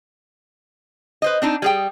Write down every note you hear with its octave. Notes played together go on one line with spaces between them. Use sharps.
B4 C5 D#5
C4 D4 D#4
G3 G#4 G5